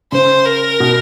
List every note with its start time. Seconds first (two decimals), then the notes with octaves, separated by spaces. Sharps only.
0.12 C#3 C5
0.45 A#4
0.80 B2